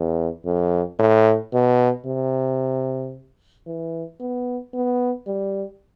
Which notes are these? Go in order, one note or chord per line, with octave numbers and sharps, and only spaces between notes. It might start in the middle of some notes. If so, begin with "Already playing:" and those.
Already playing: E2
F2
A2
B2
C3
E3
B3
B3
G3